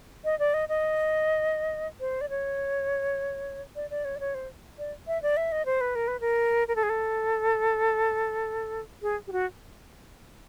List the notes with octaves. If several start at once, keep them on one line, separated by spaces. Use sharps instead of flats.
D#5
D5
D#5
D#5
C5
D5
C#5
D5
D5
C#5
D5
C#5
C5
D5
E5
D5
E5
D#5
C5
B4
A#4
B4
A#4
A#4
A4
G#4
A4
G#4
G4
F#4